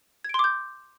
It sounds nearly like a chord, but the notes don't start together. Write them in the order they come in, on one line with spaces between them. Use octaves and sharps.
G#6 D7 C6 D6 G6